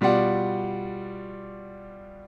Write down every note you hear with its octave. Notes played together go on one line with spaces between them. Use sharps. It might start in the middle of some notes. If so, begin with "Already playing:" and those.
B2 G3 F4 D5 F#5